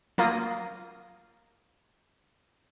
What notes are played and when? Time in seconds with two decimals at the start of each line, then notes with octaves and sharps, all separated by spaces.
0.18 F#3 A#3 F4 D#6 A#6 D#7